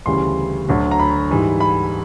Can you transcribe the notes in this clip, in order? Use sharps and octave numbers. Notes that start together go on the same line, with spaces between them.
D2 C#3 E3 G3 C6
D2 D3 F#3
A#5
B5
G#2 E3 G3
B5